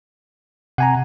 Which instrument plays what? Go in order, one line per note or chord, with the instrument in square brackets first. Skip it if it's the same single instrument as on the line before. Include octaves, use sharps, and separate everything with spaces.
[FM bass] C3 [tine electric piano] F#5 G#5 A#5